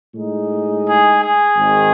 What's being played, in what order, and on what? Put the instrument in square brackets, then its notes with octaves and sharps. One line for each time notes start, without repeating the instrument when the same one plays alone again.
[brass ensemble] A2 G#3 D#4
G#4
G#4
G#1 G#2 D#3